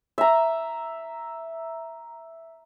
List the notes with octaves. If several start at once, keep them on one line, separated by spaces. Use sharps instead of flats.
E5 A#5